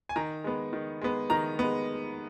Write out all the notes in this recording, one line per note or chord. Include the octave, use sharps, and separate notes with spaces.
G#5
D#3 A#5
G#3 B3
D#3
G#3 B3
D#3 A#5
G#3 B3